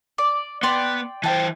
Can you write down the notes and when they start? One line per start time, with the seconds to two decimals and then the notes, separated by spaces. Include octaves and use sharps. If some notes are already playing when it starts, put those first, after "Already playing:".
0.18 D5
0.63 B3 D5 G5 C6
1.24 E3 C5 G5 A5